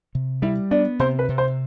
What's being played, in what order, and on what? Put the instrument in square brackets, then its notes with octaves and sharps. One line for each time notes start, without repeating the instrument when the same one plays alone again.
[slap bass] C3
[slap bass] G3 [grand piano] E4 E5
[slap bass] B3 [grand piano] D4 D5
[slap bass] C3 [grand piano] C5
[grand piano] B4
[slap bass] C3
[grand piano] C5